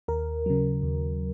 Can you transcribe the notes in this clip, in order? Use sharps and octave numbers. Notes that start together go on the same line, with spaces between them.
D#2 A#4
C#3 F#3
D#2